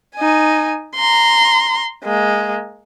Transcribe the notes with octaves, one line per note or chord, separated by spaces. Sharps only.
D#4 G#5
A#5 C6
G#3 A#3